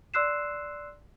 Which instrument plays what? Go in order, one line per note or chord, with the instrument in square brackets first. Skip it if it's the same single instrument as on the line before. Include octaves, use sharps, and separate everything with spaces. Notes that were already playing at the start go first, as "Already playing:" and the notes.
[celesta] D5 C6 E6 F#6 C7 E7